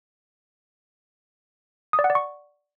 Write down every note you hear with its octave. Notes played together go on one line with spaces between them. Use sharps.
D#6
D5
F#5
D5
C#6